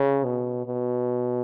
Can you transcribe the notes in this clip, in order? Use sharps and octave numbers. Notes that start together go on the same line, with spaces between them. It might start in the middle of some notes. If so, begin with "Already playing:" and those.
Already playing: C#3
B2
B2